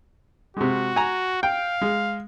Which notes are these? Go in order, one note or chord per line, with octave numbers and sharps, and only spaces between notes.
C3 G#3 F#4
G#5 A#5
F5 G5
G#3